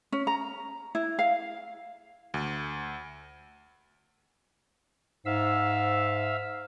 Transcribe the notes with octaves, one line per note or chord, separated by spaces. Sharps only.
C#4
A#5
E4
F5
D2
G#2 E5 F5 E6